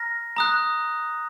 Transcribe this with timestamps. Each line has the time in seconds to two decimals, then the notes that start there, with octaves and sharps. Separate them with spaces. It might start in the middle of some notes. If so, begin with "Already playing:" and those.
Already playing: A#5 F6 A#6
0.36 A#5 D#6 F#6